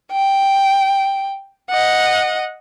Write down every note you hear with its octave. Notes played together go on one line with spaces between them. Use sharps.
G5
D#5 F#5